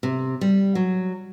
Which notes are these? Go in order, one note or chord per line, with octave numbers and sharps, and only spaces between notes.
C3
G3
F#3